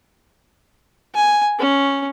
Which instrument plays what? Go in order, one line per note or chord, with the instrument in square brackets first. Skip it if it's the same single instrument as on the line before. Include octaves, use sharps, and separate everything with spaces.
[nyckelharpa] G#5
C#4